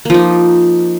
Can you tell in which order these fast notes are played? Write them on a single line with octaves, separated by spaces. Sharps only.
A#3 F3 D#4